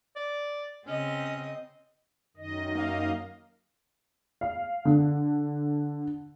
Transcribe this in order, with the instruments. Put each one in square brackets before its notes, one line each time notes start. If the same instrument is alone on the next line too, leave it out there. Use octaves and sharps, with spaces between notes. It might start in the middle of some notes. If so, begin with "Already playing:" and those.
[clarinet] D5
[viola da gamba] C#3 C4 D#5 [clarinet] C#4
[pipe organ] F#2 D#3 D#5
[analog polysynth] A#3 A#4 F5
[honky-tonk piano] F5
D3